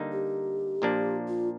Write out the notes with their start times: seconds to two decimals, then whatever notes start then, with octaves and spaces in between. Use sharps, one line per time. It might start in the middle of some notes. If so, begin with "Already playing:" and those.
Already playing: D3 G3 A#3 D#4
0.12 G4
0.82 A#2 F3 A#3 D4
1.28 F4